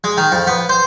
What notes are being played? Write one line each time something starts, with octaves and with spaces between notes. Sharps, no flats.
G#3
D#3
F2
B3
C5